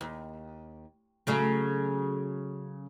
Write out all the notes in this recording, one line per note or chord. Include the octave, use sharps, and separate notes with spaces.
D#2
C#3 F#3 A3